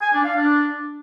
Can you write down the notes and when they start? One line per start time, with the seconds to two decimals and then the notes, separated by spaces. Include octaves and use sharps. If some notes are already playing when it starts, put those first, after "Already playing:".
0.01 G#5
0.13 D4
0.25 F5
0.36 D4